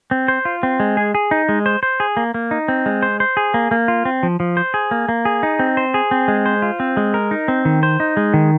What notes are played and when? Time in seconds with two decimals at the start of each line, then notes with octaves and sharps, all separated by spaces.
0.11 C4
0.28 C5
0.45 F4
0.63 C4
0.80 G#3
0.97 G#4
1.15 G#4
1.31 D#4
1.49 G#3
1.66 C5
1.83 C5
2.00 G#4
2.17 A#3
2.34 A#3
2.51 D#4
2.68 C4
2.86 G#3
3.03 C5
3.20 C5
3.37 G#4
3.54 A#3
3.71 A#3
3.88 F4
4.05 C4
4.23 F3
4.40 F3
4.57 C5
4.74 G#4
4.91 A#3
5.09 A#3
5.25 G#4
5.43 D#4
5.59 C4
5.77 C5
5.94 G#4
6.11 C4
6.28 G#3
6.46 C5
6.62 F4
6.80 C4
6.97 G#3
7.14 A#4
7.31 D#4
7.48 C4
7.65 D#3
7.83 C5
8.00 D#4
8.17 G#3
8.34 D#3